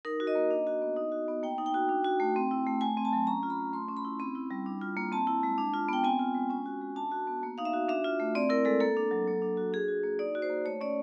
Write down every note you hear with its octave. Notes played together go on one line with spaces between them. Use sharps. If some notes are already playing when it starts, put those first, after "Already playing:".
D#4 A#4
F#4
D#5
A#3
D4
F#4
B3
D#4
F#4
B3
A#3 G5
D#4
G5
F#4
D4
F#4
A3
C4
E4
A3
A3 G#5
C4
A5
F#3
C#4 A#5
F4
B5
A3
A3 C6
C#4
B5
E4
C4 B5
E4
G3
D4
F4
A#3
C4 A5
E4
G#3
D4
F4
B3 G5
C4 G#5
F4
G#3
C#4 G#5
F#4
G#3
D4 A5
F#4
B3
A#3
D#4 F5
E5
F#4
D4 E5
F4
A3
C4 D5
E4 A#4
G#3 A4
A#3 A4
D4
F#3
A#3
D4
F#4
D4 G#4
F#4
A#3
D#4 D5
F#4
C5
A#3
A3 C#5
C#4 D5